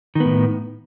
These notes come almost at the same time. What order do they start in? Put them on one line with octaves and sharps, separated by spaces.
D#3 B3 A2